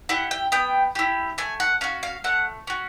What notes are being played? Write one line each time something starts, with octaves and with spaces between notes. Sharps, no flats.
E4 G4 F#5
G5
B3 G5
E4 G4
A3 G#5
F#5
C#4 F#4 F5
F5
A3 F#5
C#4 F#4